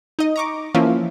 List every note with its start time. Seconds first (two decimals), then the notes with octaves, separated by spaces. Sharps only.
0.19 D#4 D#5
0.36 A#5 C#6 D6
0.74 E3 F3 A#3 C#4 E4 F4